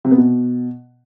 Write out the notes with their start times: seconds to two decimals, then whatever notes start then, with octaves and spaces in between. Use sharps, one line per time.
0.05 C3
0.11 B3
0.18 B2